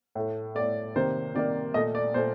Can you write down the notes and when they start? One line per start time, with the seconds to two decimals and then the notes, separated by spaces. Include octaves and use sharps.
0.15 A2 A3
0.55 A2 A3 D5
0.96 C3 D#3 A#3 C5
1.35 C3 D#3 A#3 D5
1.74 A#2 A3 D#5
1.95 D5
2.14 A#2 A3 C5